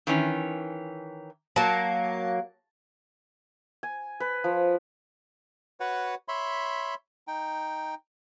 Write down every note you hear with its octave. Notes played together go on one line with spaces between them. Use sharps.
D#3 E3 C#4
F#3 A#3 A5
G#5
B4
F3
F#4 B4 C#5 F#5
C#5 E5 B5 C6
D#4 G5